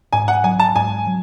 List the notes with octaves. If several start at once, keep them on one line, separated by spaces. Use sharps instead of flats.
G#2 G#5
F#5
F#3 G#5
A5
G#2 G#5
F#3